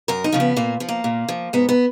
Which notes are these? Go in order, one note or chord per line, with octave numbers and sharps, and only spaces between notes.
F#2 A#4
D#4
C#3 F3
B3
A#2 A#3
F3
A#3
A#2
F3
G#2 B3
B3